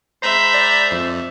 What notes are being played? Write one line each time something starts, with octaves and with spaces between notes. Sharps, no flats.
G#3 C5 E5 A#5 B5 G6
D5
F2